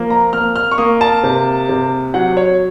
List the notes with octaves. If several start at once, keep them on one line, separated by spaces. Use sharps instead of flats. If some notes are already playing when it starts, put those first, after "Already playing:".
Already playing: F3 A#3
A#5
A#3 F6
F6
C#6
A#3 D#6
A5
C3
C3
F#3 F#5
C#5